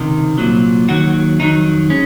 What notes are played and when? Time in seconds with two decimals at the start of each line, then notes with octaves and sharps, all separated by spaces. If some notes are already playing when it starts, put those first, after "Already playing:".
Already playing: C#2 C3 D#3
0.38 C2 A#2 F#3
0.88 D#2 D#3 F#3 F#4
1.39 F2 D#3 F#3 D#4
1.90 G#3 C#4